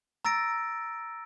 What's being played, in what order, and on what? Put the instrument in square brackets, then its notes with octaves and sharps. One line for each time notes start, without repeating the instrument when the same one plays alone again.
[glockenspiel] A#5 E6 A6 A#6 D7